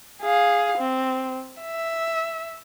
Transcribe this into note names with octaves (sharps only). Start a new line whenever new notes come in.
G#4 F5
C4
E5